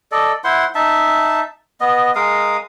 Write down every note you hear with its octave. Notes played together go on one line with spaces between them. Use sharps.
A4 D5 D#5
E4 C5 F#5 C6
D#4 E5 A5
B3 D#5
G#3 A#4 F5 D#6